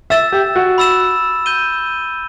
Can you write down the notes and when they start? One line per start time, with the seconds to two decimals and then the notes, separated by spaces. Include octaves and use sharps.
0.10 E5 E6 A6 E7
0.32 G4
0.56 F#4
0.78 B5 E6 A6 E7
1.46 G6 D#7 G7